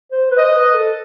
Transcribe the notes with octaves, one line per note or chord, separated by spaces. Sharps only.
C5
B4
C5 D#5
B4
A4